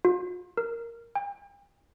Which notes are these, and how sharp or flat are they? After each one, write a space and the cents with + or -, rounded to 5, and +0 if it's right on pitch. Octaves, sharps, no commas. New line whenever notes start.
F4 +45
A#4 +0
G5 +45